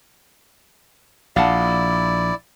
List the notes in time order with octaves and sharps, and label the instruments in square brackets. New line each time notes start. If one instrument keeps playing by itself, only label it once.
[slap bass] A#1 [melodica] E4 D5 [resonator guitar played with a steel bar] F5 F#5 A5